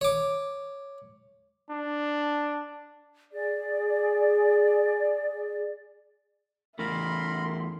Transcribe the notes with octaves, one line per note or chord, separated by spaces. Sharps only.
C#5 D6
D4
G#4 D5
E2 A3 E4 A#4 B5 C6